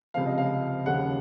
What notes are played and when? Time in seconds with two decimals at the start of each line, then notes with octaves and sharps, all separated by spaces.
0.14 C#2 C3 F3 F5
0.26 D#5
0.38 F5
0.86 D#2 C#3 F3 F#5